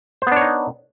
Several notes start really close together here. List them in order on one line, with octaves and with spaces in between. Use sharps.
C5 B3 D4 C#5 D#4